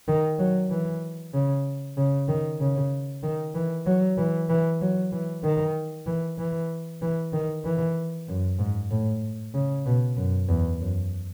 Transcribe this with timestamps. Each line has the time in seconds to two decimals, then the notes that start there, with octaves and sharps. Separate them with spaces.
0.08 D#3
0.39 F#3
0.70 E3
1.34 C#3
1.97 C#3
2.29 D#3
2.60 C#3
3.23 D#3
3.55 E3
3.87 F#3
4.18 E3
4.49 E3
4.81 F#3
5.12 E3
5.43 D#3
6.06 E3
6.38 E3
7.02 E3
7.33 D#3
7.65 E3
8.28 F#2
8.59 G#2
8.91 A2
9.54 C#3
9.86 B2
10.17 F#2
10.48 E2
10.80 F#2